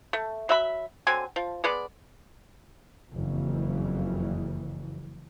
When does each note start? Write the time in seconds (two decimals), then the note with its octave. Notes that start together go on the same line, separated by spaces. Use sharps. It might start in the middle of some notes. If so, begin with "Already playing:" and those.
0.13 A3
0.49 F#3 E5 B5
1.07 D3 F#3 C4 G#5
1.36 F3
1.64 G#3 B3 D5
3.13 F#1 F2 C#3 E3